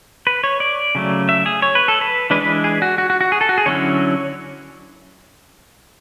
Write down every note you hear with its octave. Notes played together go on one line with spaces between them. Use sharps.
B4
C#5
D5
C#3 F#3 A3
E5
G#4
C#5
B4
A4
B4
E3 G#3 D4 B4
B4
G#4
F#4
F#4
F#4
F#4
G#4
A4
F#4
G#4
D3 F#3 C#4 E4 C#5